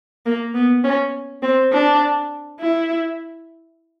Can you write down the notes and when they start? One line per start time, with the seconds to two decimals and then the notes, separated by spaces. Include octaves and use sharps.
0.26 A#3
0.55 B3
0.84 C#4
1.42 C4
1.72 D4
2.59 E4